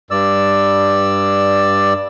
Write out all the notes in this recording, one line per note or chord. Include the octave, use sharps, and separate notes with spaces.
G2 D5 E6